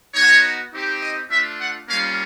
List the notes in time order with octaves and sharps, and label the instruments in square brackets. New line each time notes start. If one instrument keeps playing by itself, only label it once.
[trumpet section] B3 D#4 F#4 C#5
C4 D#4 G4
D#5
A3 D4 F4 E5
F#5
G3 A#3 C#4 F4 F5